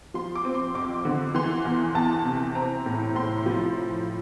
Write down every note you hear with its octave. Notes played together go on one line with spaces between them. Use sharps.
F3 C6
D6
C4
C6
F2 D6
D3
E3 C6
E2
E2 A5
C3
C4 A#5
A2
A2 C6
F3